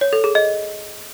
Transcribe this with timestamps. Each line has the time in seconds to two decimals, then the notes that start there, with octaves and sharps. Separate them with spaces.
0.01 C#5
0.13 A4
0.24 G#4
0.35 D#5